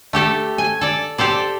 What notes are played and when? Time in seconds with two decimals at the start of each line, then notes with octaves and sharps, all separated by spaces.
0.13 A3 G4 A4
0.58 G#5
0.81 A4 D5
1.18 G4 A4 C5 D5